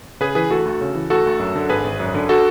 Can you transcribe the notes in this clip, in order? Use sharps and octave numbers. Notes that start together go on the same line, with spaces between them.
C#3 G#4 B4
E3 G#4 B4
D2 F#4 A4
D2
C#3
E3
D2 F#4 A4
D2
F#2
D3
G#1 G#4 B4
G#1
F#2
D3
F#4 A4